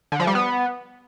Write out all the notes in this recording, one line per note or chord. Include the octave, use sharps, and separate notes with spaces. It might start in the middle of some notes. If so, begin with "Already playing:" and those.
D3
F3
G3
B3